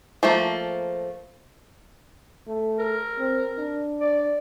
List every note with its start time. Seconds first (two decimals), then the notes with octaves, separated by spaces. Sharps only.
0.23 F3 A3 A#3
2.47 A3
2.79 A#4
3.18 C4
3.58 D4
4.00 D5